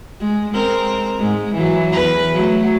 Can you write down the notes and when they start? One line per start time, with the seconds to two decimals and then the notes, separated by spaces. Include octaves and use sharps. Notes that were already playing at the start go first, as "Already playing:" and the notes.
0.20 G#3
0.53 G#3 C4 A#4
1.19 G#2 G#3
1.54 E3 F#3
1.92 E2 B4
2.34 F#3 A3